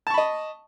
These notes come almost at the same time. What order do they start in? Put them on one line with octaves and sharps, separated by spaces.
A5 C#6 B5 D#5